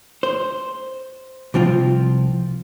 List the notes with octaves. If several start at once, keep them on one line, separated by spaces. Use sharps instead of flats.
C5
C2 F3 C4 F4